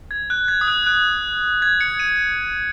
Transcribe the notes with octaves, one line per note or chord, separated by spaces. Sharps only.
G#6
F#6
G#6
D#6
F#6
F#6
G#6
C#7
D#7